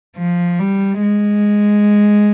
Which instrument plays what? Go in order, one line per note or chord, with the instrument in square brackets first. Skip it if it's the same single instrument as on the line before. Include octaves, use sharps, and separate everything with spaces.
[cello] F3
G3
G#3